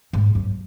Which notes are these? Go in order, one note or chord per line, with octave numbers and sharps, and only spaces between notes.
G#2
F#2